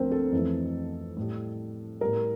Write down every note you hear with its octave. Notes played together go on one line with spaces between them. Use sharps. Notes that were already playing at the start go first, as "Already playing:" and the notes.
Already playing: D2 D3 F3 A3 C4 A#4 C5
A4
F2 E3 A3
A2 G3
A2 G3 A#4